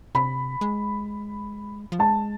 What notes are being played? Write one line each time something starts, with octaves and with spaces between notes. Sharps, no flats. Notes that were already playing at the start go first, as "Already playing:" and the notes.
C3 B5
G#3
F3
G#3 A5